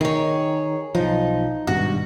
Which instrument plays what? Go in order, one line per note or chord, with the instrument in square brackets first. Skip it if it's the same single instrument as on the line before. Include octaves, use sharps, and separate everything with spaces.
[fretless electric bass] D#3 [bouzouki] G#4 C#5
[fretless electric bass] B1 F3 [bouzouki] D#4
[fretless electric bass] G#1 G2 B2 [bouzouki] F#4